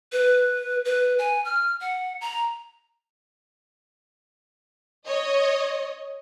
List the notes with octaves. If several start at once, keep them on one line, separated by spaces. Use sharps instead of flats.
B4
B4
G#5
F6
F#5
A#5
C#5 D#5